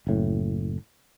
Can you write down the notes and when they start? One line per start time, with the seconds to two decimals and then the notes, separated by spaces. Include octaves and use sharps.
0.07 F#1 A2